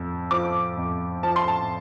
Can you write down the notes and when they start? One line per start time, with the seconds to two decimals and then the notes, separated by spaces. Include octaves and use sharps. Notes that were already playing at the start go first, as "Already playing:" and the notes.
Already playing: F2
0.31 F3 D6
0.77 F2
1.23 F3 A5
1.36 C6
1.48 A5